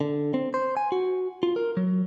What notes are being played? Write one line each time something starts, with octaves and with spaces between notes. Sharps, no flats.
D3
C4
C5
G#5
F#4
F4
A#4
F#3